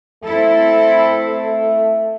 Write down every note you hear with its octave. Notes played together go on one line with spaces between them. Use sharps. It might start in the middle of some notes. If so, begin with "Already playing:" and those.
A3 C4 E4 A4